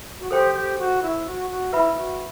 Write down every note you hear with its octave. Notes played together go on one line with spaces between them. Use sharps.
F#4
G4 A4 C5 G5 C6
G4
F#4
E4
F#4
F#4
E4 B4 E5 B5
E4
F#4